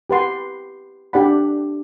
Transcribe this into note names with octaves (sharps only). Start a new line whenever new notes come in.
G4 B4 F#5 C6
D4 G4 D5 F#5 B5